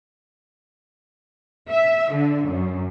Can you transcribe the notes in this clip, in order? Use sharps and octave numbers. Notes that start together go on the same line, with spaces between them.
E5
D3
F#2